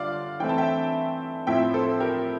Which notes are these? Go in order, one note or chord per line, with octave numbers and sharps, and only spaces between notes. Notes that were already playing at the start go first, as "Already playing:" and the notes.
Already playing: D3 G3 D4 F4 D5 F5
E3 A3 C4 G5
A5
E5 G5
A2 F3 C4 E4 E5 G5
A4 C5
G4 A#4